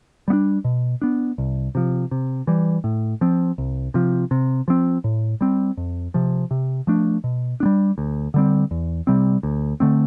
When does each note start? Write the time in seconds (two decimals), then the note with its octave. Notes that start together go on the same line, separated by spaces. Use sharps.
0.28 G3 B3
0.33 D4
0.65 B2
1.02 B3 D4
1.38 C2
1.75 C3 F3
2.11 C3
2.47 E3 G3
2.84 A2
3.21 F3 C4
3.58 C2
3.94 C3 F3
4.31 C3
4.68 F3 C4
5.04 A2
5.41 G3 C4
5.77 F2
6.14 C3 F3
6.51 C3
6.87 F3 A3 D4
7.24 B2
7.60 B3 D4
7.65 G3
7.98 D2
8.34 D3 G3 C4
8.71 E2
9.07 C3 G3 C4
9.43 D2
9.80 D3 A3 C4